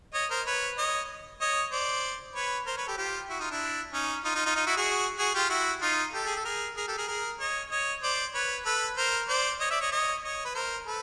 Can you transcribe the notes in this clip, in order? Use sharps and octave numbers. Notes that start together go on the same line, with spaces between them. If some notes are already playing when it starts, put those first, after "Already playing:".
C#5 D#5
A#4 C5
B4 C#5
C#5 D#5
C#5 D#5
C5 D5
B4 C#5
A#4 C5
B4 C#5
G4 A4
F4 G4
E4 F#4
D#4 F4
D4 E4
C#4 D#4
D#4 F4
D#4 F4
D#4 F4
D#4 F4
E4 F#4
F#4 G#4
F#4 G#4
F4 G4
E4 F#4
D#4 F4
G4 A4
G#4
A4
G#4 A#4
G#4 A#4
G4 A4
G#4 A#4
G#4 A#4
C#5 D#5
C#5 D#5
C5 D5
B4 C#5
A4 B4
A#4 C5
C5 D5
C#5 D#5
D5 E5
C#5 D#5
C#5 D#5
C#5 D#5
B4
A#4 C5
A4 B4